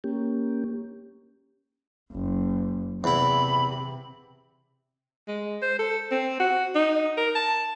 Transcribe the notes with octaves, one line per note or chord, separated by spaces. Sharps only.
A#3 C#4 G4
F#1
E2 C3 E4 B5
G#3
C5
A4
C4
F#4
D#4
A#4
A5